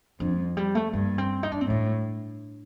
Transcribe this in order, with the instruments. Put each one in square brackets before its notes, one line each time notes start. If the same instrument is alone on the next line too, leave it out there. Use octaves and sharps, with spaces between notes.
[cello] F2 [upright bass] D4
[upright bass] F3
G3
A3
[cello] G2 [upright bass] A#3
[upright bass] C4
D#4
D4
C4
[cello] A2 [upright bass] D4